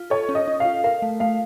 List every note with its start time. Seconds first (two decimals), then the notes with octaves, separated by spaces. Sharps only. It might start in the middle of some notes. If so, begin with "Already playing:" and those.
Already playing: F4
0.10 A4 C#5
0.29 C#4
0.35 D#5
0.48 C#4
0.60 F4 F5
0.84 A#4 F5
1.02 A3
1.20 A3 F5